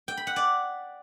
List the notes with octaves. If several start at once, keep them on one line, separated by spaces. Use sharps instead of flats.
G5
B5
F#5
D5